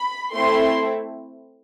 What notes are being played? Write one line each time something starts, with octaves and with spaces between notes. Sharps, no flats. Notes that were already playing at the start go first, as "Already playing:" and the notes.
Already playing: B5
A3 C4 E4 A4 C6